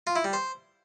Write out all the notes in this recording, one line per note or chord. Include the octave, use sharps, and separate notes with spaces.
F4
E4
G3
C5